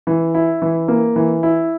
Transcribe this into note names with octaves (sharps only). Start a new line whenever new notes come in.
E3
E4
E3
A#3
E3
E4